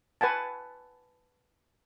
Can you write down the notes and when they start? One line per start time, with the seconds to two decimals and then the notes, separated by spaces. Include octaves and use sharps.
0.21 B4 F#5 G#5 A5